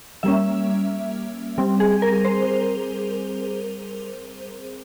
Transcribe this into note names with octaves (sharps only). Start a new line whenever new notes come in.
G3 A#3 C#4 E5
G3 C4
G#4
A#4
C5